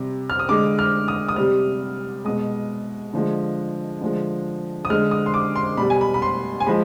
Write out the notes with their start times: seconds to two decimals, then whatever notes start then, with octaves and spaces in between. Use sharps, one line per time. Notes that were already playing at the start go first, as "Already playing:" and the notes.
Already playing: C3 G3
0.30 F6
0.39 D#6
0.49 D3 G#3 D6
0.79 F6
1.08 D#6
1.29 D#6
1.36 C3 G3 F6
2.25 B2 G#3 D#6
3.13 D3 F3 G#3
4.01 D3 F3 G#3
4.85 D#6
4.90 D3 G#3 F6
5.11 D#6
5.26 C6
5.34 D6
5.56 C6
5.77 B2 G3 B5
5.90 G#5
6.01 B5
6.14 B5
6.22 C6
6.60 G#5
6.66 F3 G#3 B5